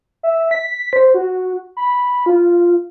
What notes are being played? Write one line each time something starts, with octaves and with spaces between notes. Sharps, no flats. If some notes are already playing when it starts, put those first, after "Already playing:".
E5
B6
C5
F#4
B5
F4